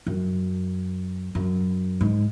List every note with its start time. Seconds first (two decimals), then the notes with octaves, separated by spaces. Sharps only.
0.07 F#2
1.35 F#2
2.01 G#2